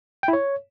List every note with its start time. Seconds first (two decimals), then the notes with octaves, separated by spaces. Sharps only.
0.23 G5
0.28 E4
0.33 C#5